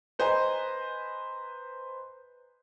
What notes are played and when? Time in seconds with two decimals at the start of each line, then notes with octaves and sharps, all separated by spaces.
0.19 B4 C5 D#5 G#5 A#5